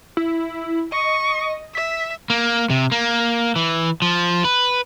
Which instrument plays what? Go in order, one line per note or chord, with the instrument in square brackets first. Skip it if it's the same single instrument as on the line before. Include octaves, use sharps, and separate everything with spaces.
[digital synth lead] E4
[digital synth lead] D#5 [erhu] C#6
[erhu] E5 [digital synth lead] B6
[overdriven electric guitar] A#3
C3
A#3
E3
F3
B4